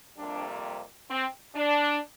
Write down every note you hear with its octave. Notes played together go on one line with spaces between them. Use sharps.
F2 C3 G3 A#3 D4
C4
D4